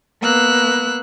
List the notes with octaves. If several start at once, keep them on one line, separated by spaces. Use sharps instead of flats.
A#3 B3 E6 F#6